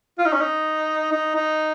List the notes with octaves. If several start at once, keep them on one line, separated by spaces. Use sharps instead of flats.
F4
D#4
C#4
D#4
D#4
D#4